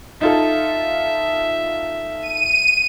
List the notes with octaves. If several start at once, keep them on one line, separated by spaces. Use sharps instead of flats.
D#4 F4 A4 E5
D#7